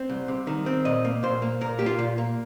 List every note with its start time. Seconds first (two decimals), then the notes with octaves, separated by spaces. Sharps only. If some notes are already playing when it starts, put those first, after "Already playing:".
Already playing: C4
0.09 C2
0.28 C3
0.47 D#3
0.66 C4
0.85 A#2 D#5
1.05 A#3
1.23 A#2 C5
1.42 A#3
1.61 A#2 A#4
1.79 A#3 G4
1.86 F4
1.99 A#2
2.18 A#3